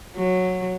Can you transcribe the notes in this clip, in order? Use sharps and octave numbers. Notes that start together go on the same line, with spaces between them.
F#3